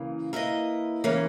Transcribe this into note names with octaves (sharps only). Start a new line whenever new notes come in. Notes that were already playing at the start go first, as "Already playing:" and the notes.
Already playing: C#3 E3 A#3
A#3 E4 B4 D#5
C#3 E3 A#3 C#4